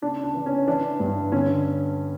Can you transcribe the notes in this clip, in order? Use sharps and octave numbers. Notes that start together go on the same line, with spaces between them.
C#3 D4
D4
E3
C#4
E3 D4
G2
D3 C#4